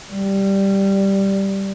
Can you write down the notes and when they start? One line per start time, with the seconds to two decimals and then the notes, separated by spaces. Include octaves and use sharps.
0.11 G3